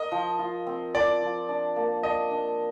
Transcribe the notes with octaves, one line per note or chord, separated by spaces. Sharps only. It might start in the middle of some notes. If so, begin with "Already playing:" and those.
Already playing: A#4 D#5
F3
F4
C4
F3 D5
F3
D4
A#3
D4 D#5
D4